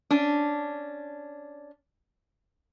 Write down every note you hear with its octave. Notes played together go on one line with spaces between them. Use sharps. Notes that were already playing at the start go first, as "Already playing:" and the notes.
C#4 D4